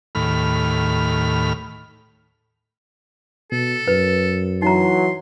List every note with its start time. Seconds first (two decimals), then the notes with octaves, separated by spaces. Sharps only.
0.15 D#2 A2 B5 F6
3.52 B2 A4
3.88 F#2 B4
4.62 E3 F#3 D#4 A#5 C6